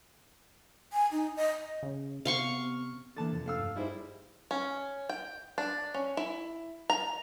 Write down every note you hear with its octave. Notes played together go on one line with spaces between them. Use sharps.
G#5
D#4
D#5
C#3
C3 B3 F5 C6 C#6
D3 E3 A#3 A5 A6
F2 C3 F3
A3 F5 E6
G2
G3 G#3 D#4 E4 C5
C#4
G5
D4
C#4
E4
A#5